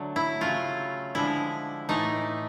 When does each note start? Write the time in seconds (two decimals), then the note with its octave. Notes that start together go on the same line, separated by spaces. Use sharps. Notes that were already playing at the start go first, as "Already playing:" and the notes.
Already playing: D3 F#3 A3
0.16 E4
0.41 C#3 F#3 A3 F4
1.15 D3 F3 G#3 E4
1.89 A2 E3 A3 D#4